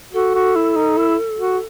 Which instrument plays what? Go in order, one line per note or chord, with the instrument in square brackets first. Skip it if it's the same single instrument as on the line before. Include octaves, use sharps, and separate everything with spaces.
[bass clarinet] F#4 [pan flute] A4
[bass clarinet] F#4
E4
D#4
E4
F#4